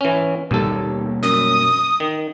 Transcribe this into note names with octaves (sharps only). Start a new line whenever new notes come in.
E3 C#4
D#2 B2 G3 A#3 A4
F#2 D#6
D#3